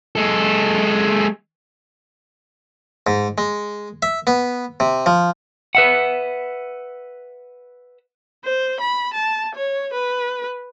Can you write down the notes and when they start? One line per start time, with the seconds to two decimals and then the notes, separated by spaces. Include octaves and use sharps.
0.16 G#3 A4
3.07 G#2
3.38 G#3
4.02 E5
4.27 B3
4.80 C3
5.06 F3
5.75 B4 E5 F#5
8.45 C5
8.80 B5
9.14 A5
9.55 C#5
9.93 B4